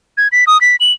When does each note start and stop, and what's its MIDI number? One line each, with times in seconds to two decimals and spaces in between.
0.17 0.28 92
0.32 0.44 95
0.47 0.60 87
0.61 0.76 95
0.80 0.92 102